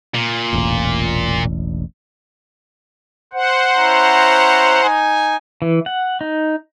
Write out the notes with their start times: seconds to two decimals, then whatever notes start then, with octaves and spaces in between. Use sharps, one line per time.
0.15 A#2
0.53 E1 A1
3.33 C5 F#5
3.76 C#4 E4 A#5
4.82 D#4 G#5
5.62 E3
5.86 F#5
6.21 D#4